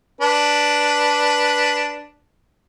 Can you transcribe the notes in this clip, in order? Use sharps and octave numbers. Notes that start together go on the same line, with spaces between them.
D4 B4